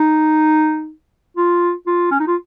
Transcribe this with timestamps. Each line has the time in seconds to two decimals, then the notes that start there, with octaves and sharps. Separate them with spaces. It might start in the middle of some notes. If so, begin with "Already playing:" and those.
Already playing: D#4
1.37 F4
1.86 F4
2.11 C#4
2.20 D#4
2.27 F4